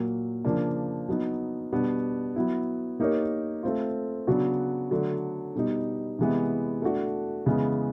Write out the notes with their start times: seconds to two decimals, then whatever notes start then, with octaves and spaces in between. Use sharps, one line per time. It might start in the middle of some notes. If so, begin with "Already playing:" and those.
Already playing: A#2 F#3 A#3
0.45 C#3 F3 A#3 D4
1.09 F#3 B3 D#4
1.73 B2 G3 B3 D4
2.36 F#3 B3 E4
3.00 A#3 D#4 G4 A#4 C#5
3.63 A3 C4 F4
4.27 C#3 F#3 B3 D4 F#4
4.91 D3 F#3 A3 D4
5.55 B2 G3 B3 D#4
6.19 C3 E3 G#3 B3
6.82 A3 D4 F#4
7.46 C#3 E3 G#3 B3